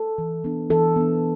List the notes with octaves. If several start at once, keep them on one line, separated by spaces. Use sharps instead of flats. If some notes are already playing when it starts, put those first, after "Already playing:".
Already playing: A4
E3
B3 D4
E3 A4
B3 D4